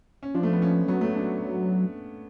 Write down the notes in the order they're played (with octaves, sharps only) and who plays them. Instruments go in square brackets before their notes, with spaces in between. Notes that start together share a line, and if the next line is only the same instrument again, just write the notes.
[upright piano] C#4
[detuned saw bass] F3 [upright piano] D4
[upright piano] A3
B3
C#4
[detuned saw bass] F#3 [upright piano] B3
[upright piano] A3
D4